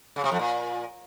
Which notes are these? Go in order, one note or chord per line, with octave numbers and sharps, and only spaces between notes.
C#3
C3
F2
A#2